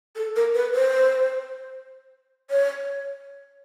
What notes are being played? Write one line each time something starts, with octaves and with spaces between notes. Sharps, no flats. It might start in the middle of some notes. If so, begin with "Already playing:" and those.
A4
A#4
B4
C5
C#5